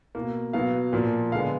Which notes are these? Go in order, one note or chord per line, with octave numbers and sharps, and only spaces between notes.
B2 A#3
B2 F#3 B3 F5
A#2 F3 A#3
D3 G#3 B3 F5